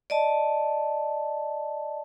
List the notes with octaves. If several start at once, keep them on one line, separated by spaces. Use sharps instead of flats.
D5 D#5 A5